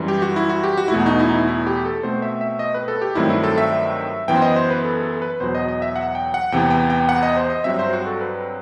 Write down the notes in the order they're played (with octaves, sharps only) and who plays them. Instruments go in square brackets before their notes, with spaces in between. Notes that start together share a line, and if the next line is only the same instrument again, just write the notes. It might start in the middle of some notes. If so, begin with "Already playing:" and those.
Already playing: [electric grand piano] F#2 E3 G3
G4
F#4
E4
F#4
G4
F#4
E4
E2 B2 A3 F#4
D#4
E4
D#4
E4
E4
G4
A4
B2 A3 C4 C5
E5
E5
D#5
B4
A4
G4
G2 D#3 F#3 A3 C4 E4
E4
A4
E5
F#2 E3 B3 G5
C5
D#5
C5
B4
A4
A4
B4
E2 B2 F#3 C5
D#5
D#5
E5
F#5
G5
F#5
E2 C3 E3 B3 G5
G5
G5
F#5
D#5
C5
D#5
G2 F#3 C4 E5
C5
F#4
A4
B4